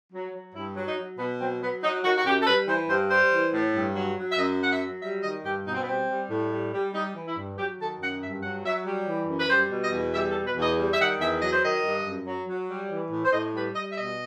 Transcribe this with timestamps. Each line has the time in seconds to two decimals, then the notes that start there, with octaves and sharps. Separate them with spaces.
0.13 F#3
0.34 F#3
0.55 G2 E4
0.77 F#3
0.87 D#4
0.98 F#3
1.19 B2 B3
1.41 F#3 C4
1.62 F#3 B3
1.83 F#3 D#4
2.04 D#3 F#4
2.17 F#4
2.26 F#2 G4
2.41 A4
2.47 G3 B4
2.68 E3 C5
2.89 G2 C5
3.10 G3 C5
3.31 E3
3.53 A2
3.75 G2
3.95 F#3
4.18 F#3
4.31 E5
4.38 F#2 D#5
4.59 F#3 F#5
4.71 E5
4.82 F#3
5.02 G3 E5
5.23 D#3 D#5
5.45 G2 G4
5.66 B2 D#4
5.74 C4
5.81 B3
5.88 G3 C4
6.09 G3
6.30 A2
6.52 G3
6.73 G3
6.94 G3 D#4
7.15 E3
7.26 E4
7.36 G2
7.57 F#3 G4
7.80 D#3 A4
8.01 F#2 F#5
8.21 G2 E5
8.43 F#3 F#5
8.65 F#3 E5
8.86 G3
9.07 E3
9.28 F#2
9.39 B4
9.49 G3 C5
9.71 B2
9.82 D#5
9.92 E2
10.14 G3 E5
10.30 A4
10.34 B2
10.45 B4
10.57 E2
10.62 D#5
10.78 G3
10.92 E5
10.99 D#3 F#5
11.20 E2 E5
11.42 F#3 D#5
11.52 C5
11.62 D#3 D#5
11.84 G2
12.05 F#2
12.26 F#3
12.48 F#3
12.69 G3
12.90 E3
13.11 A2
13.25 C5
13.33 A2 D#5
13.54 G3 B4
13.75 G3 D#5
13.91 E5
13.96 B2 D#5